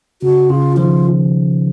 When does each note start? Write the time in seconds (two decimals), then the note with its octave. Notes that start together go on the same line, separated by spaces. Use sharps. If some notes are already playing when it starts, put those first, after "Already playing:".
0.22 C#3 F#4
0.50 C#3 F4
0.77 D#3 F3 F4